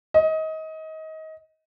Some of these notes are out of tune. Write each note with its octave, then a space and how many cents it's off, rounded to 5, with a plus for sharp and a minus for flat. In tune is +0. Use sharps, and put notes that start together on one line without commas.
D#5 +25